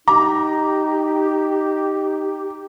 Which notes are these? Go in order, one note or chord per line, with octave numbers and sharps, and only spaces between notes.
D#4 G4 A#5 D6